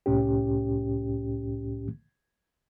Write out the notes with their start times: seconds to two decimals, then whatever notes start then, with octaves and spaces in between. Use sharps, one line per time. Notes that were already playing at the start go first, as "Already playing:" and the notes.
0.06 C2 A2 C#4 G4